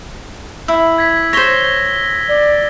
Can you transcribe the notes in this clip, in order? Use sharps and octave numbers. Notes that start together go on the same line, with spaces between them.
E4 E6
G#6 B6
C5 C#5 A#6 B6 G7
D5